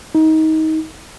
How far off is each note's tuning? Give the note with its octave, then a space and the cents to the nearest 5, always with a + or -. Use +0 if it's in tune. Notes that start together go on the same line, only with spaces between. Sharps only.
D#4 +25